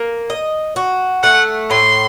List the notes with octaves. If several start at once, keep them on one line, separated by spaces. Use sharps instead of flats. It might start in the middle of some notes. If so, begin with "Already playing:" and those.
Already playing: A#3
D#5
F#4
A3 F#5
A2 C6